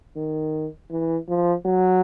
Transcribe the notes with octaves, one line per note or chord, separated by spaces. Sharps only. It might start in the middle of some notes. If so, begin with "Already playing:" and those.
D#3
E3
F3
F#3